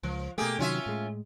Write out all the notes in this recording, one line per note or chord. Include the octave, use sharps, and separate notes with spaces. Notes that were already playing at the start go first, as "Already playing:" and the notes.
C#2 F3
B2 A3 A#3 G4 G#4
C3 D#3 F#3 C#4 F4 E5
A2 G#3